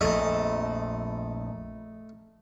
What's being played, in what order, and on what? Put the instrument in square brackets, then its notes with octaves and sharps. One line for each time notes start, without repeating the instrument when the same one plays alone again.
[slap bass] A#1 F2 [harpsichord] A3 D#5